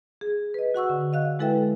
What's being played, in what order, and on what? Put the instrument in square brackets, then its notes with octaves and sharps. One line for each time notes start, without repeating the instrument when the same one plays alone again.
[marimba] G#4
B4 D#5
F#4 F#5 C#6 E6
D3
D#5 F5 F#6
G#3 E4 A4 B4 E5 G5